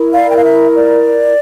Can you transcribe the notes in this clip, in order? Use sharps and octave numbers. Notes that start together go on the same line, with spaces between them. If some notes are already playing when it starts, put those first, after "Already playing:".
Already playing: E4 A#4
D5 F5
G5
F5
E5
D5